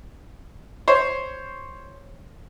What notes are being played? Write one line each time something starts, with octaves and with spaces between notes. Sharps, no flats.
C5 C#5